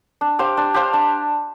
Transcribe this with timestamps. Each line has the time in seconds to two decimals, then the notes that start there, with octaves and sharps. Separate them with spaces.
0.21 D4
0.39 G4 C5 F5
0.57 D4
0.74 G4 C5 F5
0.93 D4